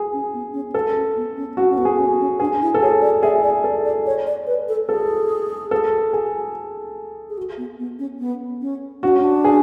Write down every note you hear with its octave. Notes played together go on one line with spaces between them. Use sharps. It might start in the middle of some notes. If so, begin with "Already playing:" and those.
Already playing: G#4
C#4
B3
C#4
A4
C#4
B3
C#4
C#4 F#4
C#4
B3
G#4
B3
C#4
C#4
D4 G#4
E4
A4
G#4 C#5
D5
G#4 E5
D5
A4
D5
C#5
D5
B4
A4
G#4 A4
A4
G#4
G#4
F#4
B3
B3
C#4
B3
C#4
D4 F#4
C#4
D4
G#4